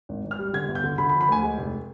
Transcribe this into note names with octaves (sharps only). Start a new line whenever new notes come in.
G#1
G#1
F6
G3
D3 G#6
G1
G6
D3
D3 B5
B5
F3
B5
D2 G#5
G#3
F1